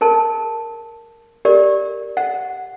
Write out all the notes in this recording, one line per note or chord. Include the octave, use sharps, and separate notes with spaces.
G#4 A#4 A5
G4 A#4 D5
F#5